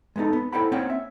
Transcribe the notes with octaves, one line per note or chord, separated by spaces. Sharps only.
G#3 B3 D4 D#4 A4
B3
E4 A4 C5 F#5 G5 B5
A#3 C4 C#4 C#5 F#5 G5
E5